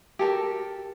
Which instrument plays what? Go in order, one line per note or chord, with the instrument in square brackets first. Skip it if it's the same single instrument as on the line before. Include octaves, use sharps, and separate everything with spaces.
[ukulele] G4 A4 A#4